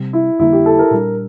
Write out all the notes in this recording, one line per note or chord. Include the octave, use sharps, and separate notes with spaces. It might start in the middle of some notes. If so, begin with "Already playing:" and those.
Already playing: C3 G3 C4
E4
F2 D3 G3 A#3 E4
G4
A4
A#4
A#2 G3 D4